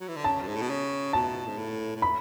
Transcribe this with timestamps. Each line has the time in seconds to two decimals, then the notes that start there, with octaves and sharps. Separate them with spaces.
0.01 F#3
0.08 E3
0.16 D3
0.24 C#3 A5
0.42 F#2
0.48 G#2
0.56 A2
0.62 B2
0.70 C#3
1.13 B2 A5
1.47 G#2
1.57 A2
1.96 A2
2.02 B5